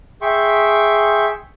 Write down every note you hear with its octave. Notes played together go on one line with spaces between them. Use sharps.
G#4 E5 G5 C6 C#6